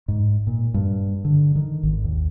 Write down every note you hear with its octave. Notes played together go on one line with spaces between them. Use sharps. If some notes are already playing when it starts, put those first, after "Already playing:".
G#2
A#2
G2
D3
D#3
G#1
D#2